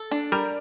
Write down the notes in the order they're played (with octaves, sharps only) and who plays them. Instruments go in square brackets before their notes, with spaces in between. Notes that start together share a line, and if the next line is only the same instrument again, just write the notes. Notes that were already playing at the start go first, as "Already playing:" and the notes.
Already playing: [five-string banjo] A4
D4
[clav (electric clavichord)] G3 [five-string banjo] A#4